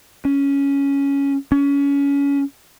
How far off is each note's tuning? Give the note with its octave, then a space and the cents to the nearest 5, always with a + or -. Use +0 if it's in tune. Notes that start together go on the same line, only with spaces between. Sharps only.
C#4 +10
C#4 +25